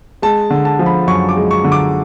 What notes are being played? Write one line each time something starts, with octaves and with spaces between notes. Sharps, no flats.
G#3 A5
D3
A5
F3
B5
F#2 C#6
D6
G#3
C#6
D3
D6